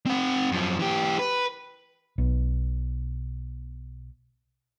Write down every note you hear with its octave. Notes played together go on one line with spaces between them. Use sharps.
C4 F#5
F#2 F3
E3 G4
B4
B1 B2